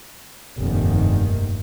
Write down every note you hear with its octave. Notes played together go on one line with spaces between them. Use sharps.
F1 A#1 G2 D#3 A#3